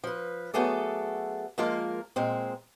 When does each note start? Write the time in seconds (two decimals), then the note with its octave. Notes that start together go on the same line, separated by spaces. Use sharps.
0.04 F3 B4
0.54 F#3 A3 B3 G#4 A4 D5
1.58 F3 G#3 A#3 F4 A#4
2.16 A#2 G#3 C4